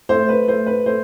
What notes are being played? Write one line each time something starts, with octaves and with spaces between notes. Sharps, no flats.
A3 C5
B4
A3 C5
B4
A3 C5